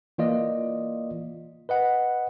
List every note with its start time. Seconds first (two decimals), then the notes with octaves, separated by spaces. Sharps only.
0.18 E3 A#3 F4 D5 D#5
1.69 B4 D#5 F#5